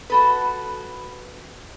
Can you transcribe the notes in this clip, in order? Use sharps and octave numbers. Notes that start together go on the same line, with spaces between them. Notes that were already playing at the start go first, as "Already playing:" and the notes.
F#4 A4 B4